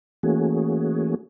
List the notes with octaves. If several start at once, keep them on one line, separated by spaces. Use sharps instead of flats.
E3 A3 A#3 C#4 F#4 G#4